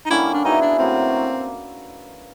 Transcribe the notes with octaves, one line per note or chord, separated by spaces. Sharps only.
D#4
D3 G3 A#3 C#4 E4
D4
F#3 B3 D#4 E4 G#4
D4
A2 F#3 A#3 C4